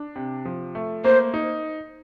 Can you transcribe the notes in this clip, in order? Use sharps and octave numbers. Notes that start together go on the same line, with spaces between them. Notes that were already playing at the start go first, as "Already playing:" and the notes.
Already playing: D4
C3
F3
A3
A#3 C5
D#4